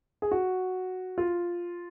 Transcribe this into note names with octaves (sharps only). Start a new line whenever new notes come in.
G#4
F#4
F4